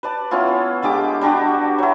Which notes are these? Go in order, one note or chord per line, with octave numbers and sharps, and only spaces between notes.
B4 D5 A5
B3 C#4 E4 F4
D3 G#3 G4 D6
G3 D4 F#4 G4
F#3 E4